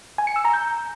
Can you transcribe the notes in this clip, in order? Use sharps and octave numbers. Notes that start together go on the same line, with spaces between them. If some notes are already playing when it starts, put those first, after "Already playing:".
G#5
C#7
E6
A#5
G6